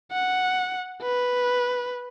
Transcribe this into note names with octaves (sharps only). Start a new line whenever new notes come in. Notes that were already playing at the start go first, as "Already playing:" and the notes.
F#5
B4